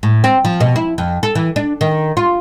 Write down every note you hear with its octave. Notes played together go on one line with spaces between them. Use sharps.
A2
C4
F3
B2
E4
F2
A4
E3
D4
D#3
F4